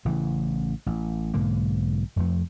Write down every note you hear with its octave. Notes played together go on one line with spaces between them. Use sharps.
A1 C#3 E3
A1
B1 G#2 D3 A#3
F1 F2 F3 A3